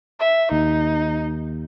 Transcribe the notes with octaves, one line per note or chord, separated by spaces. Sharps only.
E5
D#2 D#4